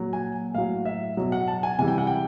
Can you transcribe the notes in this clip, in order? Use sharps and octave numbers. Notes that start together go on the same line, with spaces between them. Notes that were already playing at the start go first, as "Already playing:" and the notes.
Already playing: A#2 F#3
G#5
A2 F#3 F5
E5
B2 F#3
F#5
A5
G#5
C3 E3 G3 G#5
G5
F#5
G5